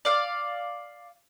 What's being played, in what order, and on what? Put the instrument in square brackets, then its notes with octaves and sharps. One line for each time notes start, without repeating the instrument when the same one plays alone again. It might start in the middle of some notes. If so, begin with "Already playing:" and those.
[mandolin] D5 F5